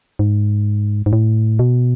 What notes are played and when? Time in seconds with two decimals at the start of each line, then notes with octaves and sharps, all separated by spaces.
0.19 G#2
1.06 G#2
1.13 A2
1.59 B2